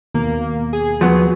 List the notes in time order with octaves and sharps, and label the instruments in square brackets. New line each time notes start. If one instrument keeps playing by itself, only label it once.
[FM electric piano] D#2 B2 [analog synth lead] A#3
[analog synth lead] G#4
[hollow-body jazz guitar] F3 F#3 B3